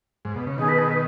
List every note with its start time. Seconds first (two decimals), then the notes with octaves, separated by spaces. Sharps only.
0.25 G#2
0.36 B2
0.47 C#3
0.58 B2 D#3 G#4
0.68 B4
0.78 G#4
0.88 B4